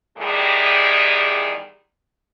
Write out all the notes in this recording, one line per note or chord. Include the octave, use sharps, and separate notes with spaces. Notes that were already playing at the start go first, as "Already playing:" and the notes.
E2 A2 D#3 G3 G4 G#4